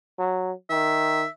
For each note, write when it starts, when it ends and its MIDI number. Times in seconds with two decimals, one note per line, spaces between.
0.19 0.51 54
0.70 1.24 51
0.70 1.28 76